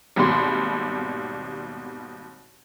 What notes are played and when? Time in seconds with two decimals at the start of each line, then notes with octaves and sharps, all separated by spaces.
0.16 G#1 D#2 B2 G3 C6